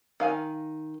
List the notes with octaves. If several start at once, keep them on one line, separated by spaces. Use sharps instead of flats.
D#3 F5 G#5